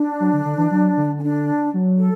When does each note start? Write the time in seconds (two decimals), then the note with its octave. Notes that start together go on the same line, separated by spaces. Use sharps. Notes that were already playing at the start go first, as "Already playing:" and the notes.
Already playing: D4
0.20 F#3
0.33 D3
0.45 D3
0.58 E3
0.71 F#3
0.97 D3
1.19 C#4
1.22 D4
1.74 F#3
1.99 A4